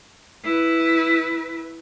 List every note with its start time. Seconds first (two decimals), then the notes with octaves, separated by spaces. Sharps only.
0.44 E4 B4